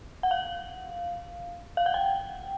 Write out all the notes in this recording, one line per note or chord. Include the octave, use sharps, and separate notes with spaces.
F#5
F5
F5
F#5
G5